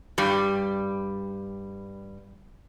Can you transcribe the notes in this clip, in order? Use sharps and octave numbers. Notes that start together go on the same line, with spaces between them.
G2 G3